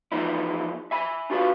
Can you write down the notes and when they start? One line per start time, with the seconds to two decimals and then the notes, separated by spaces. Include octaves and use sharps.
0.12 E3 F3 B3 D#4 E4
0.91 E5 G#5 B5
1.30 D4 F4 F#4 B4 F5